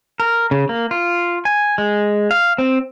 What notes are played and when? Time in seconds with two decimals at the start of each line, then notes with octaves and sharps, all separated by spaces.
0.20 A#4
0.51 C#3
0.69 A#3
0.91 F4
1.45 G#5
1.78 G#3
2.31 F5
2.58 C4